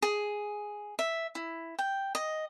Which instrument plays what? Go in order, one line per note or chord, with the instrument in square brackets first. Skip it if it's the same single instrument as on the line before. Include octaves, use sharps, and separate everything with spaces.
[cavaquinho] G#4
E5
E4
G5
D#5